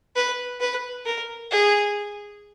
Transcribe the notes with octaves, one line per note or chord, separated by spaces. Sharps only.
B4
B4
A#4
G#4